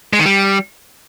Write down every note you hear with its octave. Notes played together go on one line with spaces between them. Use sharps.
G#3
D#3
G3